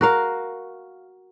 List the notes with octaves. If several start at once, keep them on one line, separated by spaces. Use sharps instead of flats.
F#4 A#4 F5